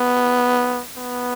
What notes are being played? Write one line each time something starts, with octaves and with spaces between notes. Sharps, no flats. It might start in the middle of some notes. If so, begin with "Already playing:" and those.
Already playing: B3
B3